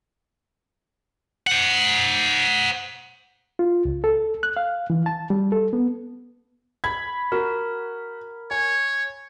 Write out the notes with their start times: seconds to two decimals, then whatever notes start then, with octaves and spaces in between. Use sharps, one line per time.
1.47 C5 F#5
3.59 F4
3.85 C#2
4.04 A4
4.43 F#6
4.57 F5
4.90 E3
5.06 A5
5.30 G3
5.52 A4
5.73 B3
6.84 B5 G#6
7.32 F#4 A#4
8.51 C#5 G#5